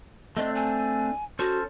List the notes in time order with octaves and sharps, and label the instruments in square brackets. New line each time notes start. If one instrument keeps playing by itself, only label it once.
[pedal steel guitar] A3 C4 D4 [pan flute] D#5
[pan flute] G#5
[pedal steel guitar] C#4 A4 C5 [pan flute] F#4